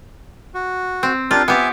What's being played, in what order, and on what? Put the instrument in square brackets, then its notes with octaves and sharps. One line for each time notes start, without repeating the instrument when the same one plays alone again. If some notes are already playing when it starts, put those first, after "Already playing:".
[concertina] F#4
[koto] C4
[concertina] D4 G4 A#4 [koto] F4
[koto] B3 G4 [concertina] E5 G#5